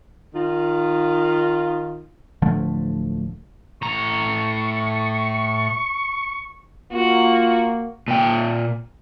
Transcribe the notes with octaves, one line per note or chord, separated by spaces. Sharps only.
D#3 F4
D1 D3 F3 A3
A2 A#5 C#6
A#3 F4 F#4
A#2 G5